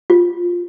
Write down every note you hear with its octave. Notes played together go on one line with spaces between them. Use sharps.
F4